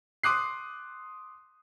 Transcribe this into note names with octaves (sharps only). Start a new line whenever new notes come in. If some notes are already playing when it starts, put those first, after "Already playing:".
C6 D6 D#6 F#6 C7